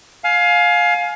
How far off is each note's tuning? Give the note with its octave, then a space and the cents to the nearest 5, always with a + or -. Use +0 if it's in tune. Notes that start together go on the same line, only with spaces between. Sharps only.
F5 +15 G#5 +25